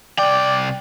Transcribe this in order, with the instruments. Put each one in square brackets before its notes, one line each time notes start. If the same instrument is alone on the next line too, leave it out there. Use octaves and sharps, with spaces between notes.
[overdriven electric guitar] C2 G5 [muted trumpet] D5